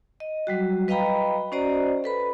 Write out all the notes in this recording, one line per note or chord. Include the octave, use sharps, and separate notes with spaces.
D#5
F#3 G3 F#4
B4 D#5 F5 G5 A#5 B5
C#4 F#4 C5 D5 D#5 A#5
A4 B4 B5